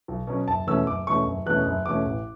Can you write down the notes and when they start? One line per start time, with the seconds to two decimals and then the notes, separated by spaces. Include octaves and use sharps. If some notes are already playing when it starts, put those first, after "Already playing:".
0.08 B1
0.27 B2 F#3 C#4
0.48 F#1 A5
0.67 E2 B2 A3 C#4 E6
0.87 F#1 D6
1.07 E2 B2 A3 C#4 C#6
1.26 F#1
1.46 E2 B2 A3 C#4 F#6
1.66 F#1
1.86 E2 B2 A3 C#4 D6
2.05 A1